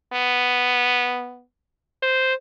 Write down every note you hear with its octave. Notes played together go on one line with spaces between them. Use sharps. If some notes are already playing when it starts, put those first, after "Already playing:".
B3
C5